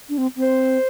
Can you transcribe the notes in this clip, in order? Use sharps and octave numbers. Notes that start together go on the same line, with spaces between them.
D4
C4
C4
C5